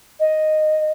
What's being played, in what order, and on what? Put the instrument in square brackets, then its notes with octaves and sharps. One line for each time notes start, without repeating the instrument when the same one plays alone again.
[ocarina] D#5